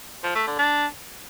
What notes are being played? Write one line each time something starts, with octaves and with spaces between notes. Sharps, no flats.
F3
A3
D3
D4